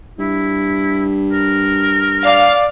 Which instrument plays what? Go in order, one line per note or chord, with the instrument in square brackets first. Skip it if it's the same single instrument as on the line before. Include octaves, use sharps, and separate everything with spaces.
[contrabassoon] G2 [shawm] E4
[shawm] A#4
[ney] D5 [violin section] F5